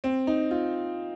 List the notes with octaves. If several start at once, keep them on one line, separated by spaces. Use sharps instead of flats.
C4
D#4
F4